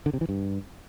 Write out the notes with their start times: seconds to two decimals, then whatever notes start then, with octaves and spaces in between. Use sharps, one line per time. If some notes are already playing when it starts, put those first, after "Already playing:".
0.06 D3
0.13 C3
0.21 E3
0.29 G2